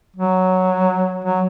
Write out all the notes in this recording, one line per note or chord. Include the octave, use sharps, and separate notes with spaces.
F#3
F#3